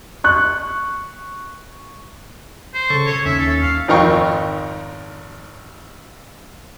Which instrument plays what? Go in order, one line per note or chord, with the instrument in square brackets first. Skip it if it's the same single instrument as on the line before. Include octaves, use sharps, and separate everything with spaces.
[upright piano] C#6 F#6
[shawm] C5
[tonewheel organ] C#3 A4 C#6
[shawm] C#5
[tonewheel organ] D#2 C#4 [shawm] E5
[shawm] A4
F5
[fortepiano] G#1 F2 D#4 A#4 G5 C#6